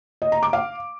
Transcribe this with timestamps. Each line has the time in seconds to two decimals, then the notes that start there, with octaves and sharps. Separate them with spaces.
0.22 D#5
0.32 A#5
0.43 D6
0.53 F5